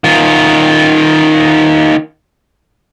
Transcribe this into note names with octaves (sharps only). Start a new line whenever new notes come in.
D#3 F4